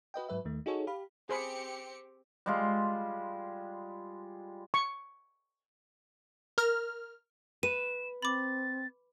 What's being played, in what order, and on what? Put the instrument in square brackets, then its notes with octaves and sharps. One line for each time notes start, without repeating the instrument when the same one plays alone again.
[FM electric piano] F#4 B4 D#5 G5
G#2 F#3 B4 E5
D#2 D#3 A3
D#4 F#4 G#4 A4 C#5
G4 F5 B5
[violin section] C4 G4 C#7 [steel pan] G#4 C5 B5
[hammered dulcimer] G3 G#3 F4
[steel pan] C#6
[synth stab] A#4 F6
[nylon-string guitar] B4 [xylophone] D#7 [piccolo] E7
[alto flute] C4 [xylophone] B5 D6 [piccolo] A6